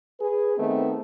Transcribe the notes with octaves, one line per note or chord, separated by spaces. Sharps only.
G#4 B4
D#3 A3 B3 C4 D#4